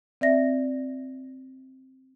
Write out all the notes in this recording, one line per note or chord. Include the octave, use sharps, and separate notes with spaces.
C4 D5 E5 A#6